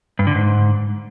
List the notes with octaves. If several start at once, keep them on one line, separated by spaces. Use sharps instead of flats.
G2
D3
G#2